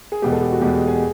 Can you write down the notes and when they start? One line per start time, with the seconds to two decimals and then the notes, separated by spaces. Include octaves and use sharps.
0.12 G#4
0.22 E2 B2 G#3 G4
0.32 A4
0.42 G4
0.52 F#4
0.62 E2 B2 G#3 G4
0.75 G4
0.87 G#4